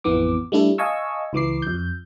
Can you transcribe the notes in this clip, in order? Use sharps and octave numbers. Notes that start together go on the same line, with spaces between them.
A1 F2 E3 B3 D6
G3 A3 D4 E4 A4
D#5 F5 G#5 A5 C#6 E6
C#2 E3 D6 C7
F2 G6